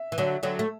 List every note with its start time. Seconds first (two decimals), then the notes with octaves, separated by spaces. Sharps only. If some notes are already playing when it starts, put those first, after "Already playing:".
Already playing: E5
0.12 E3
0.18 D3 F#3
0.43 D3 F#3
0.59 A3